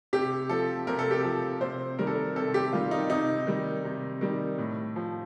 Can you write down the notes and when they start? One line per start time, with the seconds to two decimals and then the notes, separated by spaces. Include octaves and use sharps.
0.13 C3 G4
0.49 F3 A4
0.87 C3 A#4
0.99 A4
1.11 G4
1.23 F3 A4
1.61 C3 C5
1.99 D#3 G3 A#4
2.07 A4
2.15 A#4
2.36 C3 A4
2.54 G4
2.72 D#3 G3 F4
2.91 D#4
3.10 C3 D#4
3.47 D#3 G3
3.84 C3
4.21 D#3 G3
4.58 A2
4.96 F3